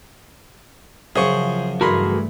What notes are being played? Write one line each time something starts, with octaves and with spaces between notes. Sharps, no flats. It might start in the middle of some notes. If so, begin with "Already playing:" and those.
F#2 C#3 F3 G#4 C5 C#6
G2 E3 A3 F#4 G#4 A#4 B5 C6